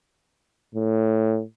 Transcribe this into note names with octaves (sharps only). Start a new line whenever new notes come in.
A2